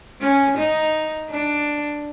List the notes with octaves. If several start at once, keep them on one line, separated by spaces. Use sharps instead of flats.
C#4
D#4
D4